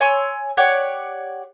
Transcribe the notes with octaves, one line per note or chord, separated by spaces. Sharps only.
C#5 G#5 C6 E6
G4 C#5 D5 F#5